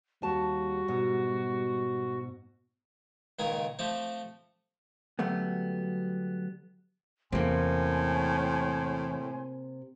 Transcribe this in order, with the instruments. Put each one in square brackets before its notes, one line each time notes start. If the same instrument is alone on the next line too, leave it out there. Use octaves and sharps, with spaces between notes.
[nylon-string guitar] D#2 A5 [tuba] G3 [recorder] F#4
[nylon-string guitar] G#2 B2
[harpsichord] C#2 A#2 D#3 A#4 G#5
F3 A3 C4 G4
[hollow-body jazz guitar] D3 F#3 G3 A3 B3
[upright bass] E2 C#4 [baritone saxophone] A2 [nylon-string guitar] C3 A#3 [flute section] G#5 C6